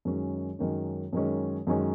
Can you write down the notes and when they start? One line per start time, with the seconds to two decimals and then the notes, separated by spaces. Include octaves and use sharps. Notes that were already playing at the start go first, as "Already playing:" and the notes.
0.05 F#2 D#3 G#3 C#4
0.59 F#2 D#3 G#3 C#4
1.13 F#2 D#3 G#3 C#4
1.67 F#2 D#3 G#3 C#4